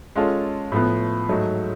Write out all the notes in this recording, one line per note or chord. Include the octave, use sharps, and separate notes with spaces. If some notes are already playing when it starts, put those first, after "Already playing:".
G#3 C#4 F4 A4
A2 F3 B3
G#2 F#3 A3